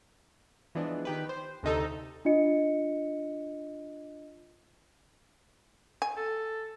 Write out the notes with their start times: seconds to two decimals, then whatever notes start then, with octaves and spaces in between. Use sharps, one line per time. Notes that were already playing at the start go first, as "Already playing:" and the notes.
0.75 E3 F3 G#3 B3 D4
1.05 D#3 G4 B4
1.29 C5
1.63 D2 C3 D#4 A4
2.25 D4 F4 D#5 C#7
6.02 G#5
6.17 A4